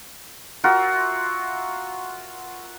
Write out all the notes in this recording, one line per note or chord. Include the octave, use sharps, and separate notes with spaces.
F4 F#4 A#4 E5